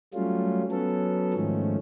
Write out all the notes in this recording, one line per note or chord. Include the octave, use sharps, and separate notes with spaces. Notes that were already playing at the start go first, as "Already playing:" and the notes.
F#3 G3 A3 C#4 F4
F#3 B3 C#4 A4
G#2 D#3 F3 A3 C#4